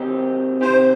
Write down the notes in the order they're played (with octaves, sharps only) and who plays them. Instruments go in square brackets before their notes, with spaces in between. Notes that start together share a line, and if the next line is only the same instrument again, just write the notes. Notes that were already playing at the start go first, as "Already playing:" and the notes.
Already playing: [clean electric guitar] D#3 C4 D#4 G4
[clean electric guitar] C3 D#3 C4 G4 [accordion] C5